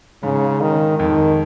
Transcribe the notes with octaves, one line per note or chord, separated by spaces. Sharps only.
G#2 C#3
D#3
F2 D#3